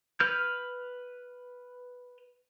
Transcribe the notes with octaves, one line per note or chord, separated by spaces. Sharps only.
B4 F6 G6